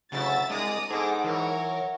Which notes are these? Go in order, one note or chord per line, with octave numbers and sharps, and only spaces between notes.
D2 C#3 F#3 E4 F#4 E5 A6
C2 G#3 D4 D5 A#5 D#6
G#2 B3 G#4 A4 D6
E3 F#3 A#4 C#5